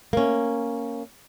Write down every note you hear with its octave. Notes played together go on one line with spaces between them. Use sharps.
A#3 C#4